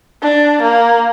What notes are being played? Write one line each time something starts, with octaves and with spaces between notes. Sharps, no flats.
D4
A#3